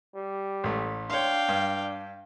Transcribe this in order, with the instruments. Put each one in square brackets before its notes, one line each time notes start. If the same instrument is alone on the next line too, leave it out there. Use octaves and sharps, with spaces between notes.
[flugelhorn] G3
[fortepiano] A1 A3
[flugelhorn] D4 [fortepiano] C#5 C6 [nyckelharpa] F5 G5
[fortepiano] G2